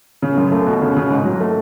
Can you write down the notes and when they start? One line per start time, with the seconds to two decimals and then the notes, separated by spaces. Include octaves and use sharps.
0.22 C#3
0.38 F#2
0.52 A3
0.67 B2
0.82 C#3
0.96 C#3
1.10 G#2
1.25 F#3
1.40 A3